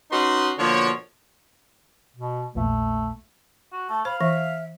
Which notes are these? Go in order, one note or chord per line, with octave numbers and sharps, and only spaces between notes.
C#4 D#4 F#4 B4 D#5 C6
B2 D3 F3 A#3 C#5
B2
A#1 E2 A#2 A3
F#4
A3 A5
C5 F5 B5
E3 E5